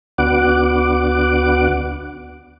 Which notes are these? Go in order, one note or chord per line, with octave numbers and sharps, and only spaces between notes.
D2 B3 D4 F#4 F#5 D6